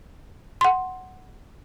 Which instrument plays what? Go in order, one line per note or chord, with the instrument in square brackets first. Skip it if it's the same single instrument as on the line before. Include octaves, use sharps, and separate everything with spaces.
[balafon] F#5 C6